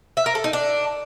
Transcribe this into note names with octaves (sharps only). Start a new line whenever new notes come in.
E5
A#4
A4
D#4
D4